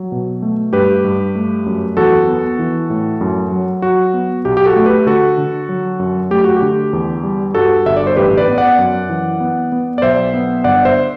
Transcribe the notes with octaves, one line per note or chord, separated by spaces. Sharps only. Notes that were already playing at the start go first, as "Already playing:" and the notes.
Already playing: F#3
B2
A3
G2 G4 B4
G2
A3
F#2
E2 F#4 A4
B3
E3
A2
F#2
F#3
F#3 F#4
B3
B1 G4
G4
F#4 A4
A3
G4 B4
D3 F#4 A4
D3
F#3
F#2
A3 G4
F#4
G4
D3
E2
G3
G2 F#4 A4
G1 E5
D5
C5
A1 G4 B4
B4 D5
B3
D5 F#5
F#2
E3
B3
B3
D5
B1 C5 E5
B3
G1 D5 F#5
C5 E5